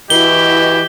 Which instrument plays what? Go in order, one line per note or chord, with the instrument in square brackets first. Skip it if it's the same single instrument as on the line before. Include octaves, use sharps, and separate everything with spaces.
[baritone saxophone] E3 [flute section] E4 F#4 D#5 [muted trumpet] G4 [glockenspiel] G7